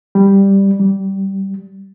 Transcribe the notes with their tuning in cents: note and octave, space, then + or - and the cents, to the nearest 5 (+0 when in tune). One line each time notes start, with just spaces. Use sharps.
G3 +5
G3 -15